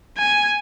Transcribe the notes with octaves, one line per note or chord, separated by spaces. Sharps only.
G#5